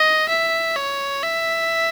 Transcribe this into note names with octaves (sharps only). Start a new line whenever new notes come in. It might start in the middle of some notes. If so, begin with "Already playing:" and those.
Already playing: D#5
E5
C#5
E5